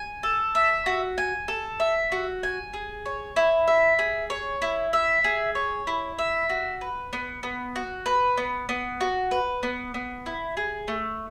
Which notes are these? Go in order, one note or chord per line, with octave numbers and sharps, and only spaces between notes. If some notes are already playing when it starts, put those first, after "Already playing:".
Already playing: G#5
A4
E5
F#4
G#5
A4
E5
F#4
G#5
G#4
C#5
E4
E5
G#4
C#5
E4
E5
G#4
C#5
E4
E5
F#4
B4
B3
B3
F#4
B4
B3
B3
F#4
B4
B3
B3
E4
G#4
A3